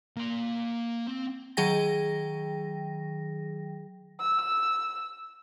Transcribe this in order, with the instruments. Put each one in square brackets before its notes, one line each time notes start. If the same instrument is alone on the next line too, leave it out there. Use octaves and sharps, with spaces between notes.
[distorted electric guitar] A#3 C6
C4
[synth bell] D#3 F#3 G#4 G5 A#6
[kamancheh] E6